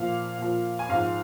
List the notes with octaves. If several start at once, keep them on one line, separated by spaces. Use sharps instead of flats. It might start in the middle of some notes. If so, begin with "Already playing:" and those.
Already playing: A#2 F3 F5
A#2 F3
G#5
G#2 F3 F5